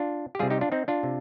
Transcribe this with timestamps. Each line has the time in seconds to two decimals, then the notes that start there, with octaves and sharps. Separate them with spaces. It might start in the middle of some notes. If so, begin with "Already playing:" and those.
Already playing: D4 F4
0.35 G4
0.39 C3 G3 F4 G#4
0.50 D#4 G4
0.61 D4 F4
0.72 C4 D#4
0.88 D4 F4
1.03 C3